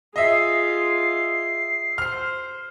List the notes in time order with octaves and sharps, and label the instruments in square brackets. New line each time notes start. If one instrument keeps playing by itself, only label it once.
[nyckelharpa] F4 G#4 [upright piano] D#5 E5 [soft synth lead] C7
[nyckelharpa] C5 [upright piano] F6 C7